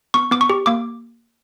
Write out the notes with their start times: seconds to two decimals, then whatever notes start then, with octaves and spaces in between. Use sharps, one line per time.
0.14 B3 C#6
0.31 B3 D6
0.41 C#6
0.50 G4
0.66 A#3 D6